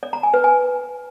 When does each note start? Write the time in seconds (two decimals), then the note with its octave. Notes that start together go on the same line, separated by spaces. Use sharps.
0.03 D5
0.13 A#5
0.23 G#5
0.34 B4
0.44 G#5